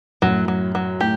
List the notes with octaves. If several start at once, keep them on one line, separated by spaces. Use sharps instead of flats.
F#2 A2 F#3
F#3
F#3
A2 G4